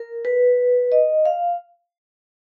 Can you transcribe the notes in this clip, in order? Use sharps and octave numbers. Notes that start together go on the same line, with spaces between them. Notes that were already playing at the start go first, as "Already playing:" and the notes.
Already playing: A#4
B4
D#5
F5